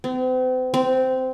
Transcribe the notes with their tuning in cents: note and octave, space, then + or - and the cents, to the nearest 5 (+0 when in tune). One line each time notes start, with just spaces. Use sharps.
C4 -40
C4 -15